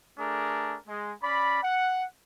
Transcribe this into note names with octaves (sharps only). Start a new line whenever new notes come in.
A3 D4 G#4 A#4
G#3
C#4 D5 B5
F#5